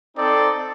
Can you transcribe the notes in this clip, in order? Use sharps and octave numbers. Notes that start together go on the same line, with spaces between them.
C4 D#4 A4 D5